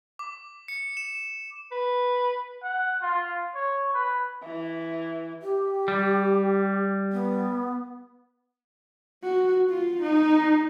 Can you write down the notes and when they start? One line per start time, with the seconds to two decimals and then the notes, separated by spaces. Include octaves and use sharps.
0.19 D6
0.68 C#7
0.97 E7
1.72 B4
2.63 F#5
3.02 F4
3.55 C#5
3.94 B4
4.44 E3
5.41 G4
5.88 G3
7.12 B3
9.23 F#4
9.69 F4
10.02 D#4